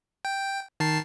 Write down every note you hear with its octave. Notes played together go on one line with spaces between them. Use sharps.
G5
D#3 A5 C7